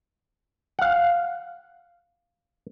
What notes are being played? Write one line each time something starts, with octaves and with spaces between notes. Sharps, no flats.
F5 F#5